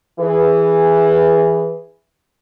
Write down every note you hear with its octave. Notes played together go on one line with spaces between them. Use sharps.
E3 G#4 B4